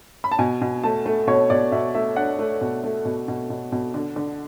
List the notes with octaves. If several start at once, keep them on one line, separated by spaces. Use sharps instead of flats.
B5
A5
B2 G#5
B2
A3 A5
A3
B2 C#5
B2 D5
B2 E5
A3 E5
D4 F#5
A3
B2
A3
B2
B2
B2
B2
D3
D3